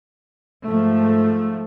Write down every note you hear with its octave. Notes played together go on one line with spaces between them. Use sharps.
G#2 F3 A3